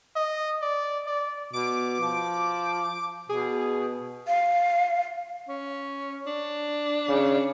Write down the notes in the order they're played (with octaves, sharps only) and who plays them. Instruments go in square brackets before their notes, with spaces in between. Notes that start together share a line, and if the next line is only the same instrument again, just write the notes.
[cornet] D#5
D5
D5
[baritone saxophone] B2 [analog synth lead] D6
[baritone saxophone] F3
[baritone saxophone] B2 [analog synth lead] G#4
[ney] F5
[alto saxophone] C#4
D4
[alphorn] C#3